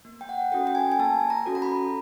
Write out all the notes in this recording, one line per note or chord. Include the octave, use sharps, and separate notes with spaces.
A#3
G5
F#5
C#4 F#4 A4 G5
G5
G#5
G#5
A#3 A5
A#5
C#4 F#4 A4
A#5
B5